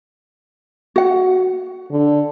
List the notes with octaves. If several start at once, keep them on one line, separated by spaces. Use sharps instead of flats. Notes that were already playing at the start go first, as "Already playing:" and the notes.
F#4 F#5
D3